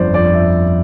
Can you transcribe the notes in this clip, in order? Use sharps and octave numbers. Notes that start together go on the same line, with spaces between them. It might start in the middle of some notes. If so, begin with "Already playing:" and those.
Already playing: G1 F2 C5 D5
F2 D5
E5